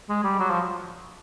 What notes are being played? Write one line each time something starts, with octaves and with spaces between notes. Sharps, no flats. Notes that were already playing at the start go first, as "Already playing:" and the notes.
G#3
G3
F#3
F3